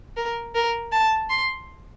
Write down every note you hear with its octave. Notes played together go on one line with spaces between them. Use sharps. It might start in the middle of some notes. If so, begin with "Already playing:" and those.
A#4
A#4
A5
C6